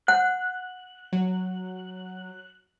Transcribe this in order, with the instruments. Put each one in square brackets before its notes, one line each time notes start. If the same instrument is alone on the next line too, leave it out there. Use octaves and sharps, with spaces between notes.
[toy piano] F#5 [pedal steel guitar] F#6
[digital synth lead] F#3